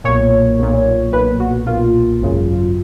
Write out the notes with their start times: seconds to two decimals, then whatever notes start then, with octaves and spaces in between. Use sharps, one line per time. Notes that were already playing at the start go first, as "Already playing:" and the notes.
0.04 B1 A#2 C#5
0.59 B1 A#2
1.12 B1 A#2 B4
1.40 F#4
1.66 B1 A#2 F4
2.21 G#1 F#2 C#3